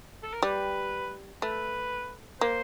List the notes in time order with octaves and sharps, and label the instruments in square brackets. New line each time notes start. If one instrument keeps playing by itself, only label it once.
[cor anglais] A4
A#4
[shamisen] G3 [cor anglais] B4
[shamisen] A3 [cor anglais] B4
[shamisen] A#3 [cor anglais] C5